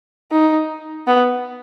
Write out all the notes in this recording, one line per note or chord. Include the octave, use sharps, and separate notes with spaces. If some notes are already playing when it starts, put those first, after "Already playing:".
D#4
B3